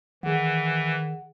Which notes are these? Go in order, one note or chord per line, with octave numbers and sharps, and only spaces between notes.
D#3 E3 G#4 F#5